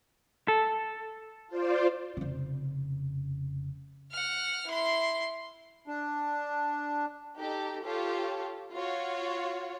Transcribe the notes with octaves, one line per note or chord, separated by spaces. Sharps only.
A4
F4 C5 D5
F1 C#3
F#5 F6
E4 C6
D4
D#4 G4 A4
F4 G4 A4 C#5
F4 F#4 C#5